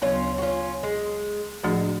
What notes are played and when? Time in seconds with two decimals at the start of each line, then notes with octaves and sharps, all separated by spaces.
0.01 D2 C#3 F#3 B3 C#4 D4 F4
0.38 F#4
0.42 C#4 F4
0.83 G#3
1.63 A2 F3 G#3 A3 D4 F#4